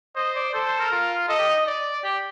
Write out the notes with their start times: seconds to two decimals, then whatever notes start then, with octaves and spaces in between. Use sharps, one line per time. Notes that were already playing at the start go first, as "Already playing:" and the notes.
0.16 C5 D#5
0.35 D5
0.54 A4 C5
0.67 C5
0.79 A#4
0.92 F4
1.29 A4 D#5
1.39 G4
1.48 D#4
1.67 D5
2.04 G4